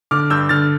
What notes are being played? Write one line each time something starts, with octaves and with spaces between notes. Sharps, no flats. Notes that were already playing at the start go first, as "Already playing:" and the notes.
D3 D6 F6
G2 E6 G6
D3 F6 A6